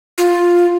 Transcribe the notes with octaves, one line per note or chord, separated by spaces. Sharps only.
F4